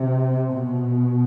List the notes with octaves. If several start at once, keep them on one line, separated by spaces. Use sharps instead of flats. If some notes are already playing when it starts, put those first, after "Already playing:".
Already playing: C3
B2